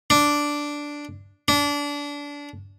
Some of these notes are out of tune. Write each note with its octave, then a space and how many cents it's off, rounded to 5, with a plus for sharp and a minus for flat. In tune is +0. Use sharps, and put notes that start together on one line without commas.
D4 -5
D4 -25